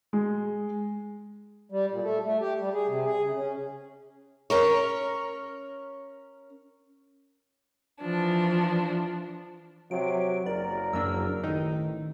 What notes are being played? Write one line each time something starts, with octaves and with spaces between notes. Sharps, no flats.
G#3
G3
A#2
A3
A3
G4
G3
G#4
C3
G#4
C#3
C#4
C#4 A#4 C#5
E3 F3 D4
C3 F#3 D7
F#1 A#4 D5
F#2 A#3 D4 E6
A1 D#3 D#4